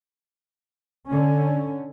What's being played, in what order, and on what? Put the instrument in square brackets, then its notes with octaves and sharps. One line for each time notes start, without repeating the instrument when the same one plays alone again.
[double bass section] D3 C#4